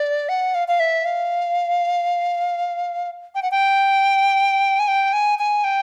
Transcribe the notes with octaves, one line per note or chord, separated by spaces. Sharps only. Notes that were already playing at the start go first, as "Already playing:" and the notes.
Already playing: D5
F#5
F5
F5
E5
F5
G5
F#5
G5
G#5
G5
G#5
G#5
G5